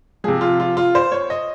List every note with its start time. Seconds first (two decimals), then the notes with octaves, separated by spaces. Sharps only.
0.24 C3 F3 G#4
0.41 F4
0.60 F4
0.77 F4
0.95 C5
1.12 C#5
1.30 D#5